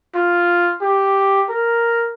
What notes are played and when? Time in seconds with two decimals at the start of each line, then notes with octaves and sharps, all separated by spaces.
0.15 F4
0.81 G4
1.49 A#4